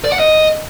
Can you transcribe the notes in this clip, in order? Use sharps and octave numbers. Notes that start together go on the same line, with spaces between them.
D5
F#5
D#5